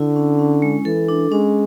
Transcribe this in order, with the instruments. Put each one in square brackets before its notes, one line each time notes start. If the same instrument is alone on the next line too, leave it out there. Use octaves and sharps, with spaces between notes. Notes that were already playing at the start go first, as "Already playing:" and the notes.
Already playing: [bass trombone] D3 [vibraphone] E4
[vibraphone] C#4
C#4
G#3
[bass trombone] E3 [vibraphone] A4
[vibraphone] D4
[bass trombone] G#3 [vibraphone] C#4